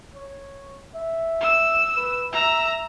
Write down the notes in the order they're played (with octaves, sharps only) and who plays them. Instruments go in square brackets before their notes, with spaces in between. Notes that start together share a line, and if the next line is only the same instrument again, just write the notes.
[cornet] C#5
E5
[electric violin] E6
[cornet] B4
[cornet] E5 [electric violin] A#5 E6